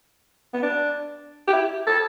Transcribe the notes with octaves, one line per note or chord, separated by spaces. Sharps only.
B3
D4
G4
E4
A4